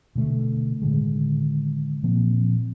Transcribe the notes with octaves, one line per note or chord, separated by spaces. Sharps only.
B2 D3 A3
A2 D3 D#3 G#3
A#2 F3 A#3 C4